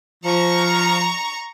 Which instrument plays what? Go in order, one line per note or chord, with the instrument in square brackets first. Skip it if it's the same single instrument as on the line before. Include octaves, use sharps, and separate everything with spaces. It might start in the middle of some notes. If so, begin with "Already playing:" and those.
[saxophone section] F3 [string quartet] A#5 C#6